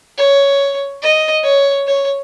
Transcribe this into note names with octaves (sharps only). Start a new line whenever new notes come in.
C#5
D#5
C#5
C#5